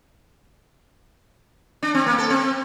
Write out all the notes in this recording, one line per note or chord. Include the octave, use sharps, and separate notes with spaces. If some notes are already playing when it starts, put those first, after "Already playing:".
D4
C4
A#3
A4
C4